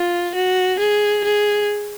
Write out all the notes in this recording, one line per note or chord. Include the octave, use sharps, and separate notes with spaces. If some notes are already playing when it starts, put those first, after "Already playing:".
Already playing: F4
F#4
G#4
G#4